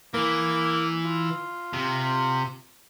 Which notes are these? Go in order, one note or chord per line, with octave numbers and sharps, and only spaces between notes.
E3 A#3
F4
C3